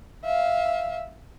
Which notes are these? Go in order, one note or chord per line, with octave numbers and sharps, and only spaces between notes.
E5 F5